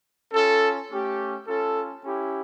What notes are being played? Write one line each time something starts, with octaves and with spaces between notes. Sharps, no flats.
C#4 F4 A4
A3 C#4 G4
C#4 F4 A4
C#4 E4 G4